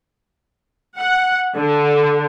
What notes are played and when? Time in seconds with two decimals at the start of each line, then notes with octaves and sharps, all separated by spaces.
0.98 F#5
1.56 D3